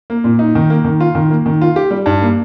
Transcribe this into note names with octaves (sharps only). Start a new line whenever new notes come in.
A#3
A#2
D#4
D#3
A#3
D#3
F4
D#3
A#3
D#3
F4
G4
G3
G2
A#3